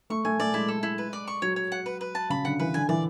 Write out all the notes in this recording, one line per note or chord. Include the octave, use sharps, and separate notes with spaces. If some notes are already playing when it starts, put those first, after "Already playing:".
A3 C#6
A3 G#5
A3 D5
G#3 E4
A4
E4
B4
D5
C#6
F#3 C#5
C#5
F#5
B4
B4
A5
C#3 B5
D3 F#5
E3 B4
D3 G#5
E3 D5